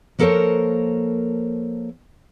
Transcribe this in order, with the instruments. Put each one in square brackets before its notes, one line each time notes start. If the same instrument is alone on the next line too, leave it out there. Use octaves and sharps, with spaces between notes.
[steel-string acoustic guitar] F3 A#3 A4 A#4 C5 C#5